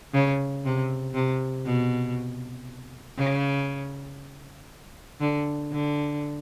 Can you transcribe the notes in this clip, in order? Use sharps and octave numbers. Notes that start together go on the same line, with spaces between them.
C#3
C3
C3
B2
C#3
D3
D3